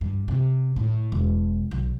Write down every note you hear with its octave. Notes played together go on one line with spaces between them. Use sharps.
G2
C3
A2
E1
B1